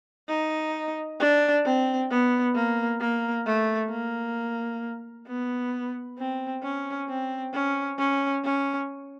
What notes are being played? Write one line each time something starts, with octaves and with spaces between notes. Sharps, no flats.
D#4
D4
C4
B3
A#3
A#3
A3
A#3
B3
C4
C#4
C4
C#4
C#4
C#4